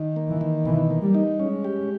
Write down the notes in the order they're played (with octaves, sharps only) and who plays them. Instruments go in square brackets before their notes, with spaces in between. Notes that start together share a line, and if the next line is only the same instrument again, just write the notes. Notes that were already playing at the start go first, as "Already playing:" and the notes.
Already playing: [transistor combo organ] D#3
A#3
[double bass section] E3
[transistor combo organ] D#3
[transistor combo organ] B2 [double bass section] E3
[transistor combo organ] A#3
[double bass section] G3
[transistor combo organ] D#4
[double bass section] G#3 [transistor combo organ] C#4
[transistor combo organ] G4